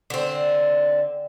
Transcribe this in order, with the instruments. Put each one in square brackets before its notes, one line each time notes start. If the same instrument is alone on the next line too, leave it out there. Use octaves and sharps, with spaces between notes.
[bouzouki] D3 C4